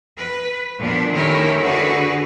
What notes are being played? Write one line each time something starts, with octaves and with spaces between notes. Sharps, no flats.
B4
A#2 F3 B3 D4
D#3 A3 C#4 E4 G4 A#4
D3 F#4 G#4 B4